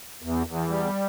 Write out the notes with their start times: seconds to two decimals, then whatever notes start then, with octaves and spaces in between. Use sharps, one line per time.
0.22 E2
0.47 E2
0.69 G3